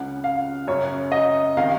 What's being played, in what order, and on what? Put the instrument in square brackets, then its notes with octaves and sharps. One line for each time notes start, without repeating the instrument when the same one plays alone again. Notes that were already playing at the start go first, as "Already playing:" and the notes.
Already playing: [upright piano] C#2 C#3 F#5
F5
F#2 C#3 C#5
D#5
C3 D#3 F5